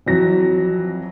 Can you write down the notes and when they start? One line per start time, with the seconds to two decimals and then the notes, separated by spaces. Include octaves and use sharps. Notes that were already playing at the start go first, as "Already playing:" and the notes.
0.06 F2 E3 F#3 A#6